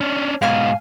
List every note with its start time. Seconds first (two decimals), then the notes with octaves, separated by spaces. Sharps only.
0.01 C#4 D4
0.42 G#2 B2 F5 G#5 F6